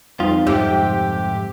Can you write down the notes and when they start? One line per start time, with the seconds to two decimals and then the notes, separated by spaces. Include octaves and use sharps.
0.20 F2 G3 D#4 F4
0.47 F2 G#2 C3 G4